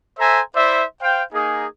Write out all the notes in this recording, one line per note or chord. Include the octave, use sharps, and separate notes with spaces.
A4 C5 E5 G#5 A#5
E4 C5 D5 E5
C5 F5 G5
A#3 D#4 G#4